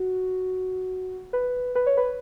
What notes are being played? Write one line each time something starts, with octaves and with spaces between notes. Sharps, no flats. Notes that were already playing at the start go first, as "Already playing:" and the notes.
Already playing: F#4
B4
B4
C#5
B4